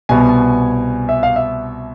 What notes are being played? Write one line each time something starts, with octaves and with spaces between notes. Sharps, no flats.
C2 B2 B3 G#5
E5
F5
E5